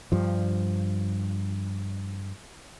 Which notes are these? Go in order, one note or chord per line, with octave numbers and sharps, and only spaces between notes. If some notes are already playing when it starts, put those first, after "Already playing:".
G2 F3